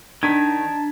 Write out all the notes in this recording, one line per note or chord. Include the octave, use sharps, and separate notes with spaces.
D#3 D4 A5 A#5 G#6 B6